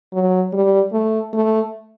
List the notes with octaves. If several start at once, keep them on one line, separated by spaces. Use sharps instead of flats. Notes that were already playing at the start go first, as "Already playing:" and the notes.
F#3
G3
A3
A3